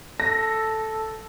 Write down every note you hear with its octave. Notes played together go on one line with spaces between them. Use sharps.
A4 A#6